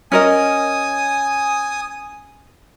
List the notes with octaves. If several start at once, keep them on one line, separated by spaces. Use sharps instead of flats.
C#4 A#4 D#5 G#5 D#6